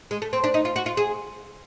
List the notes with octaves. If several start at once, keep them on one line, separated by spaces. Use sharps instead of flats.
G#3
A3
C4
D4
D#4
F4
F#4
F4
G#4